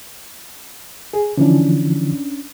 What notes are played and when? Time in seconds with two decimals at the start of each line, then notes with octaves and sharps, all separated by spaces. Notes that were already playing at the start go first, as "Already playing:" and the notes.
1.13 G#4
1.37 D3 E3 F3 C#4 D4